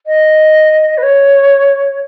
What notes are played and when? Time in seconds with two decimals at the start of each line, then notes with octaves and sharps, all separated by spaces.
0.06 D#5
0.97 B4
1.02 C#5